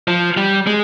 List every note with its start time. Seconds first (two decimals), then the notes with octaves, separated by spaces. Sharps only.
0.08 F3
0.37 G3
0.67 G#3